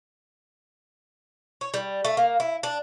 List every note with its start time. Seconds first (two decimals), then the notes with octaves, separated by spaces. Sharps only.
1.61 C#5
1.74 G3
2.05 A3
2.17 A#3
2.40 E4
2.63 D4